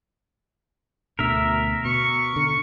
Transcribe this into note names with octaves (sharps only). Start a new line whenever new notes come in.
D2 B2 D3 A#4 E5
B2 C#6
D3